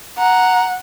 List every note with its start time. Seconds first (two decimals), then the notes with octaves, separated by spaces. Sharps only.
0.18 F#5 A#5